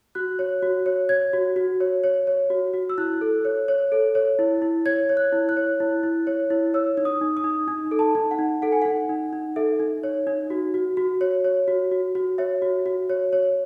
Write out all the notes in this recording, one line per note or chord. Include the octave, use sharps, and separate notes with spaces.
F#4 F#6
C#5
F#4
C#5
C#5 G#6
F#4
F#4
C#5
C#5
C#5
F#4
F#4
E6
E4 F#6
A4
C#5
C#5
A4
C#5
E4
E4
C#5 G#6
C#5
F#6
E4
F#6
C#5
E4
E4
C#5
E4
C#5 E6
D#4
D#6
D#4
D#6
D#4
D#4
A4
A5
D#4
F#5
D#4
A4 F#5
G#5
D#4 F#5
D#4
D#4
A4 E5
D#4
C#5
D#4
F#4
F#4
F#4
C#5
C#5
F#4
F#4
F#4
C#5 E5
F#4
F#4
C#5
C#5